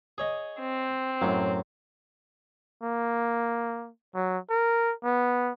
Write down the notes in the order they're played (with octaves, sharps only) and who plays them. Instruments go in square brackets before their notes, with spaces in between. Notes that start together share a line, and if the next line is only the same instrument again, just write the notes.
[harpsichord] G#4 C#5 D#5
[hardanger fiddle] C4
[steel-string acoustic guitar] F#2 [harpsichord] A2 F#3
[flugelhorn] A#3
F#3
A#4
B3